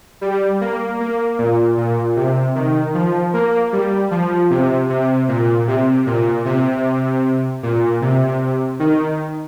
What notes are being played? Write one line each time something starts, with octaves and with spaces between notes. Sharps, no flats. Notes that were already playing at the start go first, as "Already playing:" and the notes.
G3
A#3
A#3
A#2
A#2
C3
D#3
F3
A#3
G3
F3
C3
C3
A#2
C3
A#2
C3
A#2
C3
D#3